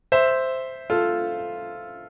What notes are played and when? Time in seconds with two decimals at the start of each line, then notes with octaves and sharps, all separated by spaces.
0.12 C5 E5
0.90 F4 A4